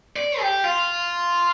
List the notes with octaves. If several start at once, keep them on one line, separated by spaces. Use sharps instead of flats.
D5
G4
F4